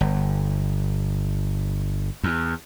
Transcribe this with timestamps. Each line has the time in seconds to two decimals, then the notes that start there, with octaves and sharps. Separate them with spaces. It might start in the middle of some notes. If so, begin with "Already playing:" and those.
0.01 G1
2.24 E2